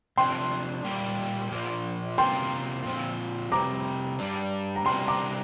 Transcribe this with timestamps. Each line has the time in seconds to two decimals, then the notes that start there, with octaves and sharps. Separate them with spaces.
0.18 C3 F3 D4 G5 C6
0.84 A#2 G3 A#3 G4
1.51 A#2 F3 A#3
2.18 C3 A#3 F4 A#4 G5 C6
2.85 A#2 F3 C4 F4
3.52 F2 C3 G3 A#5 D6
4.19 G2 G3 D4
4.76 A#5
4.86 C3 G3 D4 A#4 G5 C6
5.08 A#5 D6